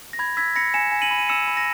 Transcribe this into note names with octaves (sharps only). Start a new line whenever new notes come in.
A#6
B5 G#6
E6 G#6 B6
B5 A#6 C#7
G#5 C#7 E7
G#5
D#7 F#7
B5
D#7
E6 C#7 E7
B5
A#6